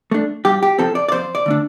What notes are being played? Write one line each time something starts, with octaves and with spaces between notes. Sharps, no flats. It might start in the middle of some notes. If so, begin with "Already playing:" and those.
A3 D4
G2 G4
G4
F3 C4 A4
D5
D5
F2 C5
D5
D3 A3 D4